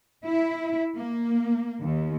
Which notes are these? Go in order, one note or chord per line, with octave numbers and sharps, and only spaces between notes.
E4
A#3
D#2